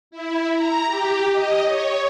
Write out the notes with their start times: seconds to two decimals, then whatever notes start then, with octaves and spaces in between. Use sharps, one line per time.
0.11 E4
0.53 A#5
0.85 G4
1.32 D#5
1.65 C#5